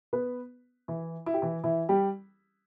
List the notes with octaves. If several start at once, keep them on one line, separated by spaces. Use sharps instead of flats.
B3 B4
E3 E4
E4
G4
E3 E4
E3 E4
G3 G4